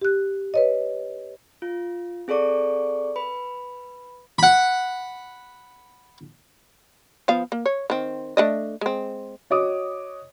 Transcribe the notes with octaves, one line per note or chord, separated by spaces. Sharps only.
G4 F#6
B4 C#5 D#5
F4
C4 G#4 A4 D5 C#6 D6
B4 B5
F#5 B5
F3 B3 F5
A#3
C#5
D#3 C4
A3 D4 D#5
G#3 C4
F#4 C#5 D#5 D6 D#6